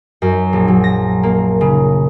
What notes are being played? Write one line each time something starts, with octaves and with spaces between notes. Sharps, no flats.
F#2
A#1
F#3
A#6
A#3
C#3